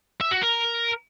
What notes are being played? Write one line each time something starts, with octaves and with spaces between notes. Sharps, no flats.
E5
F#4
A#4